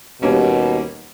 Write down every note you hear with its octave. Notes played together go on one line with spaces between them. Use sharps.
D#2 B2 G3 A#3 C#4